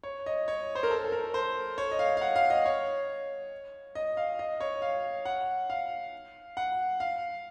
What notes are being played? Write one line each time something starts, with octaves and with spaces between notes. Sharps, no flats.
C#5
D#5
C#5
C5
A#4
A4
A4
A#4
C5
C#5
D#5
F5
F5
F#5
F5
D#5
C#5
D#5
F5
D#5
C#5
F5
F#5
F5
F#5
F5